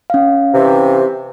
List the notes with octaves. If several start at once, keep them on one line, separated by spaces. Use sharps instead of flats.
C#4 F5
C3 E3